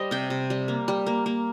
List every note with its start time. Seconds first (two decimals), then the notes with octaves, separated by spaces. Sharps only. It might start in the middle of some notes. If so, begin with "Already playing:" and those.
Already playing: G3 C5 D#5
0.11 C3 G5
0.30 C3
0.50 G3
0.68 A#3
0.88 G3
1.06 A#3
1.26 A#3